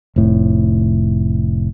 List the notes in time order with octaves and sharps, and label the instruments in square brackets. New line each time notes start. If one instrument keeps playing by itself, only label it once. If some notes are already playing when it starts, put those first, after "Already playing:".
[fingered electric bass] F1 A2